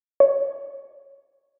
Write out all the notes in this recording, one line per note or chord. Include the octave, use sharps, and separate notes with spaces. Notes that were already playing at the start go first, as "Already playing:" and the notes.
C#5